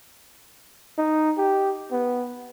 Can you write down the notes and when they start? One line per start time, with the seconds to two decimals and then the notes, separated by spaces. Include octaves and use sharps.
0.98 D#4
1.37 G4
1.91 B3